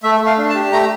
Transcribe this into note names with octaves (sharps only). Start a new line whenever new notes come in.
A3 E5
A3
F5
D4
A5
G4
A3 A#5